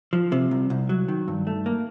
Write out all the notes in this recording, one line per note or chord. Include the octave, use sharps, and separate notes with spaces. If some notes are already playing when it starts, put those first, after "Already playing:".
F3
C3
C2
C2
F#3
D#3
G2
A3
A#3